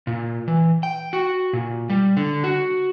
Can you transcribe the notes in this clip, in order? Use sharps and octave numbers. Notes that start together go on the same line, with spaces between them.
A#2
E3
G5
F#4
A#2
G3
D3
F#4